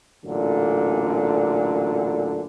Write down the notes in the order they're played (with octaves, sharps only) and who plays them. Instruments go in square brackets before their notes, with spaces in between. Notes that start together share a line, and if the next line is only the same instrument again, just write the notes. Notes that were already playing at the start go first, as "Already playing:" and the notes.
[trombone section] A1 F#2 A#2 D3